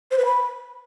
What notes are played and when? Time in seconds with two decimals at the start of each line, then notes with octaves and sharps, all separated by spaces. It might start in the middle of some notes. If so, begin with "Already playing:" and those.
0.11 C5
0.18 B4
0.25 B5